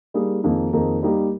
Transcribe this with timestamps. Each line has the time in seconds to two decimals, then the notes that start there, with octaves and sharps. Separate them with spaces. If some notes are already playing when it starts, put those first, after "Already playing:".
0.14 G3 A#3 D#4 G#4
0.43 F2 D#3 A#3 D#4 G#4
0.73 F2 D#3 A#3 D#4 G#4
1.02 G3 A#3 D#4 G4 A#4